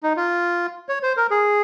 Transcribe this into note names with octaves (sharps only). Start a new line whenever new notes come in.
D#4
F4
C#5
C5
A#4
G#4